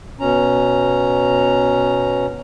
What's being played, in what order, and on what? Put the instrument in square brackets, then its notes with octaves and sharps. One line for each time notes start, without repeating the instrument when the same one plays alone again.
[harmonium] B2 C#4 A#5